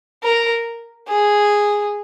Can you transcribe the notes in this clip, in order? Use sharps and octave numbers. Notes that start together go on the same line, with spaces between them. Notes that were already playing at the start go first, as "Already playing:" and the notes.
A#4
G#4